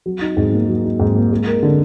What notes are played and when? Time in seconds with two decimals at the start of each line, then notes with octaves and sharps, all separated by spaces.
0.06 F#3
0.21 D#4
0.37 G#2
0.52 A#3
0.68 F#3
0.84 D#4
1.00 G#2
1.15 A#3
1.31 G#3
1.47 A#4
1.63 D3